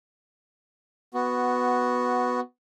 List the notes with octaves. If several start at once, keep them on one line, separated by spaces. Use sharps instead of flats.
B3 F#4